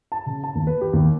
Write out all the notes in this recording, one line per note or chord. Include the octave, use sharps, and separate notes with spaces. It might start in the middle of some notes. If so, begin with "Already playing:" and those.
A5
C#3
A5
D#2
B4
G4
D#2